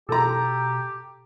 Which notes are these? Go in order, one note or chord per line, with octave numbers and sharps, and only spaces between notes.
B2 G4 A4 A#5